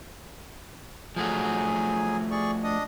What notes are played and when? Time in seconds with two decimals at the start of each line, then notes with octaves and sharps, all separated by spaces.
1.16 F3 F#3 A3 F#4 G#4 G#5
2.31 G#4 D5 C#6
2.64 D4 D#5 D#6